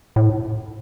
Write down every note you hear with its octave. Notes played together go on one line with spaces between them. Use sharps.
A2